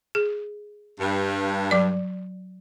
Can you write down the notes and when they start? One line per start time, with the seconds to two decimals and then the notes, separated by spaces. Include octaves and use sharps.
0.15 G#4
1.00 G2
1.71 F#3 D5